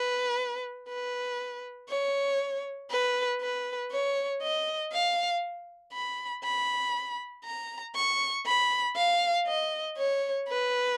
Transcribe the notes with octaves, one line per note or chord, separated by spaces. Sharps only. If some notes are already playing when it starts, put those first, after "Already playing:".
Already playing: B4
B4
C#5
B4
B4
C#5
D#5
F5
B5
B5
A#5
C#6
B5
F5
D#5
C#5
B4